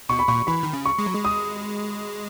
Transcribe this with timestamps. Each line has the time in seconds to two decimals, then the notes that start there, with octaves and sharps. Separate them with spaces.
0.09 B2 C#6
0.19 B5
0.28 A#2 C#6
0.47 E3 B5
0.63 D#3
0.73 C#3
0.85 C#6
0.99 G#3
1.06 F#3
1.14 G#3
1.24 D#6